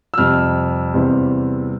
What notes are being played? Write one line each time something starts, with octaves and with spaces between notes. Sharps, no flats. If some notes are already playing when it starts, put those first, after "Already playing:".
E6
F2 C3 G3 F6
E2 C3 G3 C4